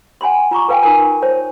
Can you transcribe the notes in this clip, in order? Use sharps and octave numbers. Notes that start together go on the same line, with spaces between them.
F#5 G#5 B5 C6
F4 A#5 C#6 D6
A4 B4 F5 G5 G#5
D#4 F4 A#4 G#5 A5
C5 C#5 A5